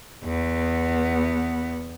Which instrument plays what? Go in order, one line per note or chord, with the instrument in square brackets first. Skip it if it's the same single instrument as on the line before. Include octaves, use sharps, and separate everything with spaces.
[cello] E2 B3